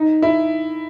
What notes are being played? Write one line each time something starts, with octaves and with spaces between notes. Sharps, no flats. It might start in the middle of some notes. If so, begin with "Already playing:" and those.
Already playing: D#4
E4